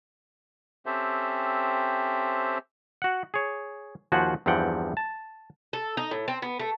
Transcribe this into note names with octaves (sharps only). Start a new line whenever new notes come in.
C4 C#4 G4 A4 C5 E5
F#4 F#5
G#4 C#5
D#2 F3 F#4 C5 F#5 G#5
E2 G2 F3 C4 F#5 G5
A5
A4
D#4
A2
C4
B3
A3